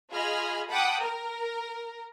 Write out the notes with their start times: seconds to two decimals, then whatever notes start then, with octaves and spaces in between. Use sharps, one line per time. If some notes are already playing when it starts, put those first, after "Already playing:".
0.11 F4 G#4 D#5 B5 F6 G#6
0.68 F#5 G5 A5 B5 D6 D#6
1.00 A#4